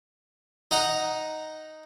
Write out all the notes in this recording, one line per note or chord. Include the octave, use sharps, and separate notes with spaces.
D#4 F#5 A#5